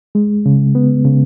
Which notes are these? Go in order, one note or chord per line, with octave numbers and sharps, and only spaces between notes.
G#3
C#3
B3
C#3